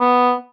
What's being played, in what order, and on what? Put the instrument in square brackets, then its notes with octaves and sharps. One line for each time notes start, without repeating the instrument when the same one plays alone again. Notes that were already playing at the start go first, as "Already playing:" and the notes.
[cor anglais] B3